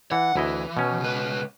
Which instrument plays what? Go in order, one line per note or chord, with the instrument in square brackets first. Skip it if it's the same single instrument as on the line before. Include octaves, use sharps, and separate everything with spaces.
[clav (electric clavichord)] E3 [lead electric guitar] F#5
[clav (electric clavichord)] D2 E4 D#5 [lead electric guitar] E3
[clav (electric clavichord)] B2 C#4
[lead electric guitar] C#2 B4